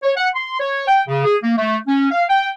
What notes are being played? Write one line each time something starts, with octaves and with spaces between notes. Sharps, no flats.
C#5
F#5
C6
C#5
G5
C#3
G#4
A#3
A3
C#4
F5
G5